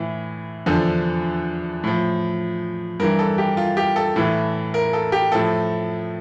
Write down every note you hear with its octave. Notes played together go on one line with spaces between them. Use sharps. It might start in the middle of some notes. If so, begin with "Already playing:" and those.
Already playing: A2 E3
E2 D3 F3 A4
A2 F3
G2 E3 A#4
A4
G4
F4
G4
A4
A2 E3
A#4
A4
G4
A2 F3 A4